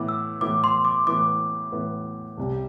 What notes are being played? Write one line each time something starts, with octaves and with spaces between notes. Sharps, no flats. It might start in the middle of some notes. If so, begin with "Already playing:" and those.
Already playing: A2 E3 B3 E4 D6
E6
A2 E3 B3 E4 D6
C6
D6
A2 E3 B3 E4 D6
A2 E3 B3 E4
C2 C3 G3